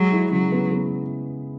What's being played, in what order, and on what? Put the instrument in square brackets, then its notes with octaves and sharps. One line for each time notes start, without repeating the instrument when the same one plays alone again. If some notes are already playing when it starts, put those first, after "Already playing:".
Already playing: [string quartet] F#3 [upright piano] G#3
[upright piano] E4
[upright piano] C#3 [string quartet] F#3
[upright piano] B3
B3